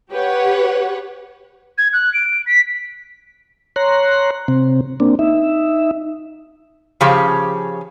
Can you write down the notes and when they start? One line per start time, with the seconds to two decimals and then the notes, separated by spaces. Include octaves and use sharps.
0.12 G4 B4 C#5 F#5
1.78 G#6
1.93 F#6
2.13 D7
2.46 B6
3.76 C#5 A#5 C6 F#6
4.48 C3 C4
5.00 A#3 C4 D4
5.19 D#4 E5
7.01 C#3 F3 C#4 G4 G#4